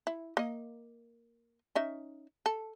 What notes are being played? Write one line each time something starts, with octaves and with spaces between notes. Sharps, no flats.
E4
A#3 D#5
C#4 D#4 E5
A4